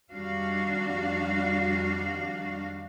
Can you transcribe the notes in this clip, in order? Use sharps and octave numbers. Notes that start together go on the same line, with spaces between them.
F2 D#3 G3 D4 F#4 F5